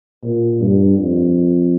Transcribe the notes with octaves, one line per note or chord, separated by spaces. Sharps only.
A#2
G2
F2